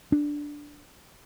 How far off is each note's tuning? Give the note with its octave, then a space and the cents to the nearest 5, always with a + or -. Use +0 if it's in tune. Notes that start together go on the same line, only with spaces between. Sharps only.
D4 +0